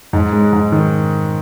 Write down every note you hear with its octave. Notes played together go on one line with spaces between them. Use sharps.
G#2
G#3
G#2
D#3